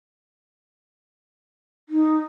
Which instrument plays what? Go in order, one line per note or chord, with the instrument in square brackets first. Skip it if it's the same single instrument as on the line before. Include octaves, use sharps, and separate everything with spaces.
[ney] D#4